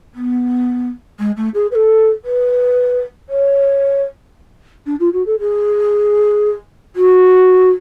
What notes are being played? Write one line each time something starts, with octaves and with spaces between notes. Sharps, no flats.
B3
G#3
A3
G#4
B4
A4
B4
C#5
D4
F4
F#4
A4
G#4
F#4